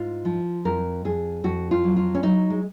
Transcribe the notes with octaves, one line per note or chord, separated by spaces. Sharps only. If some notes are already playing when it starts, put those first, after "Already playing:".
Already playing: G#2 F4
F3
F2 A#4
F2 G#4
F2 F#4
F4
F#3
F4
C#4
F#3 D#4
G#3